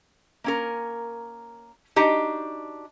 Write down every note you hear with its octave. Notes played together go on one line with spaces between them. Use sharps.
A#3 C#4 A#4
D4 D#4 F#4 G4 D#5